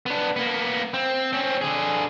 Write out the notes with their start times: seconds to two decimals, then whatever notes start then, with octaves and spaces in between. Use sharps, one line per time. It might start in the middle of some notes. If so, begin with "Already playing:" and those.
0.06 B3 D4
0.36 A#3 B3
0.94 C4
1.33 C4 C#4
1.61 D3 G#4